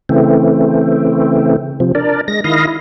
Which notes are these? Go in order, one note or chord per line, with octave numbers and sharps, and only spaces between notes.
C#3 E3 A3 C4
C3 F3
D4 A#4 D5
G#3 A#6
D#3 E4 D#5 F5 A#6
E4